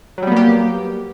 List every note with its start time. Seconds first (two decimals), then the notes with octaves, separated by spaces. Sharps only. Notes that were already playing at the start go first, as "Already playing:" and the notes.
0.18 F#3
0.23 G3
0.27 B3
0.32 A#3
0.36 G4